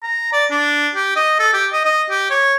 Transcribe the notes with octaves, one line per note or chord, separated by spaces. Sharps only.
A#5
D5
D4
G4
D#5
A4
G4
D#5
D#5
G4
C#5